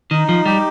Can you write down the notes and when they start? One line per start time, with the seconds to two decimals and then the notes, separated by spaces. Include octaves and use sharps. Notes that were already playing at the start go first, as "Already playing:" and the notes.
0.11 D#3 D#4
0.29 F3
0.46 G3 G4